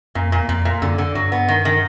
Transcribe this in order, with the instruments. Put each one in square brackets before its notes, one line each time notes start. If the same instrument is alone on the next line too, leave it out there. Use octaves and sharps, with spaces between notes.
[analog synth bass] F#2 [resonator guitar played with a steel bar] A#2
[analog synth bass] F2
[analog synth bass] E2 [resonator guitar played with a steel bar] A#2
[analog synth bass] F2 [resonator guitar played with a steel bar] A#2
[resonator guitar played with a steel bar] A#2
[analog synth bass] F#2 [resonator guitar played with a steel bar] D3
[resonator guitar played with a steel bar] D3
[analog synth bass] G2 [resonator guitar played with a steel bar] F#3
[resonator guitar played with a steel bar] B3
D#3
D#3